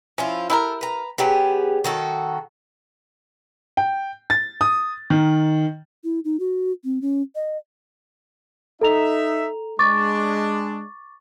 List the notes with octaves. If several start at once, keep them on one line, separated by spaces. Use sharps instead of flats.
F3 C#4 E4 F4
E4 G4 A4 A#4
B4 A#5
B2 F#3 B3 G4 G#4
D#3 F#4 A4
G5
A6
D#6
D#3
E4
D#4
F#4
C4
C#4
D#5
D#4 A4 E5 A#5 F7
G#3 D4 C#6 D6 A6